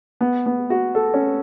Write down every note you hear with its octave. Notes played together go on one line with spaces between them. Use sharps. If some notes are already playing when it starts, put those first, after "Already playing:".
B3
B3
F#4
A4
C#4